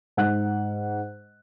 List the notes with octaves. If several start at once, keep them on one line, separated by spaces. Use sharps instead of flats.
G#2 F#5 F#6